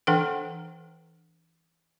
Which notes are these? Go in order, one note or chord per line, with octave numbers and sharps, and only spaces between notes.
E3 D4 A4 B4 F#5 G5